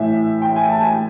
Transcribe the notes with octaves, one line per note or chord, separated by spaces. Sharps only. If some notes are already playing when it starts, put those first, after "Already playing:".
Already playing: A2 E3 E5
G5
G#5
A5
G#5